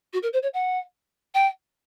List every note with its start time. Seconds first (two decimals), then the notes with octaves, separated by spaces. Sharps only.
0.13 F#4
0.23 A#4
0.33 C5
0.43 C#5
0.54 F#5
1.34 G5